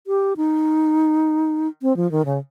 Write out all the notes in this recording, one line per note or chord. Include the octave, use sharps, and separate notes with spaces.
G4
D#4
C4
F3
D#3
C#3